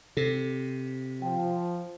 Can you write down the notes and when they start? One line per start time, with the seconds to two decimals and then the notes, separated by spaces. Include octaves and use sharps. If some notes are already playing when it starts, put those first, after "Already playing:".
0.17 C3 A4
1.22 F3 G5